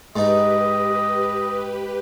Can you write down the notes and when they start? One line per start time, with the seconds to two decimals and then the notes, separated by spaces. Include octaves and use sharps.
0.16 G#2 D#4 G4 B4 D#5